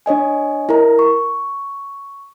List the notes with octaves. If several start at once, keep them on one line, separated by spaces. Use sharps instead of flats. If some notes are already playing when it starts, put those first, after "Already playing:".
D4 C#5 D#5 G#5
E4 A#4 A#5
C#6